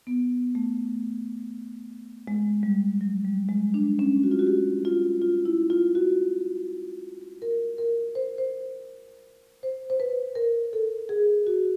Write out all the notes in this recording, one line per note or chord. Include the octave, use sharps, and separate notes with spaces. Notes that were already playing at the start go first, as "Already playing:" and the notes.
B3
A3
G#3
G3
F#3
G3
G#3
D4
C#4
F#4
F4
F#4
G4
F4
F4
E4
F4
F#4
A#4
A#4
C5
C5
C5
C5
B4
A#4
A4
G#4
F#4